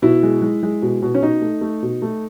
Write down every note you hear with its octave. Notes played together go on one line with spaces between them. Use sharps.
B2 E4
G#3
G#3
G#3
B2
B2
C#4
B2 D#4
A3
A3
B2
A3